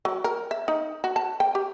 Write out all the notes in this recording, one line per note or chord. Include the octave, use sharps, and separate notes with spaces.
F#3
A#4
E5
D#4
F#4
A5
G5
G4